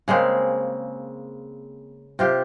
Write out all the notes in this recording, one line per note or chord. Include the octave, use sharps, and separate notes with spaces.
C#3 G#3 A#3 C4
C3 F4 G4